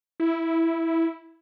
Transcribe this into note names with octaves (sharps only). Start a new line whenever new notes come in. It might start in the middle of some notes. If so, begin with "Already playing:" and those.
E4